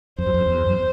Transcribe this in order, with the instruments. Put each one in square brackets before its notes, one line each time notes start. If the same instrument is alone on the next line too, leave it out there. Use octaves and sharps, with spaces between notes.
[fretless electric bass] F2 [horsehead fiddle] C5
[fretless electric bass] F#2
F2
E2
F#2